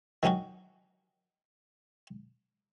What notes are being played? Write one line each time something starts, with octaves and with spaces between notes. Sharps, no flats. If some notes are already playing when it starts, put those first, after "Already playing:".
D#3 F#3 C#4 D#4 F#4